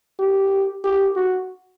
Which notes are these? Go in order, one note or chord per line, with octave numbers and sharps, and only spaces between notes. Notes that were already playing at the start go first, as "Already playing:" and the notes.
G4
G4
F#4